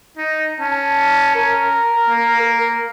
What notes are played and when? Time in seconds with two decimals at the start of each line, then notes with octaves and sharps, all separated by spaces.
0.17 D#4
0.60 C#4 A5
1.35 A#4
2.09 A#3
2.42 A#4